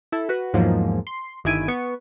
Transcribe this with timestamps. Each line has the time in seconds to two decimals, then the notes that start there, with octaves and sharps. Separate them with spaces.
0.12 E4 A4
0.29 F#4 B4
0.53 E2 G#2 F3 F#3 A#3
1.07 C6
1.44 G1 D#3 E4 G#5 D7 D#7
1.68 B3 C#6